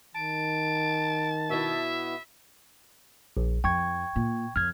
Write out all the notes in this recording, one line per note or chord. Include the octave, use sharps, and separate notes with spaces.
D#3 A5 D7
B2 B3 E4 E5
A#1
F2 G5 C#6 G#6
A#2
F2 F6 G#6